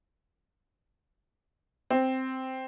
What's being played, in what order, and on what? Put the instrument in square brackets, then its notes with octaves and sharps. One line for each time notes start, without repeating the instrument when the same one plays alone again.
[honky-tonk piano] C4